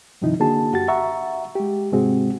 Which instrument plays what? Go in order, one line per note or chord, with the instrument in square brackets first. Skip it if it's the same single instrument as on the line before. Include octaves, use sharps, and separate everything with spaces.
[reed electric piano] G2 C3 D#3 F3 D#4 E4
D3 A#3 D4 F#4 G#4 A5
F#2 F#4 G4 A6
E5 F#5 A#5 C#6
G#3 G4
G#2 C3 G#3 C4 F#4 G#4